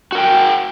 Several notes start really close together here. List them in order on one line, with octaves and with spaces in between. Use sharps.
F#4 A#4 G5